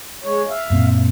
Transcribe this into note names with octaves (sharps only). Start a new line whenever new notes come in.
G#3 C#5
E5 F5
F#2 A#2 C4